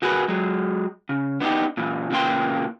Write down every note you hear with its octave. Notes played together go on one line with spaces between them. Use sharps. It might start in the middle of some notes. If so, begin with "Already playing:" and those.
D3 F#4 G#4 A#4 B4
F#3 G#3
C#3
B3 D4 D#4 G4
A#2 E3
A#2 C#3 E3 A#3 G5 C6